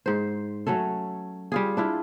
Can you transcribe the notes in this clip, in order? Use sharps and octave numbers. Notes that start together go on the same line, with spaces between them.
G#2 C5
F#3 A3 C#4 A4
G3 F4 G#4
D4 E4 F4